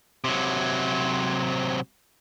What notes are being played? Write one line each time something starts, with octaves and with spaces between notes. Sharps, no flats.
C3 F#3